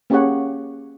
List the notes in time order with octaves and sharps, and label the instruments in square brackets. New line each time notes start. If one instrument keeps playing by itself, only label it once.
[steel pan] A#3 C#4 G4 G#4 C#5 F#5